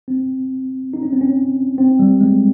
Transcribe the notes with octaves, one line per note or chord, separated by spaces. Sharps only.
C4
D#4
C#4
C4
C#4
C4
G3
G#3